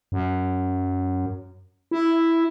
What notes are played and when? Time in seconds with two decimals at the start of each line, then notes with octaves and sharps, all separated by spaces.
0.12 F#2
1.91 E4